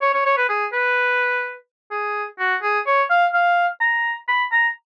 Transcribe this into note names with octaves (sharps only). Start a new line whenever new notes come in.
C#5
C#5
C#5
B4
G#4
B4
G#4
F#4
G#4
C#5
F5
F5
A#5
B5
A#5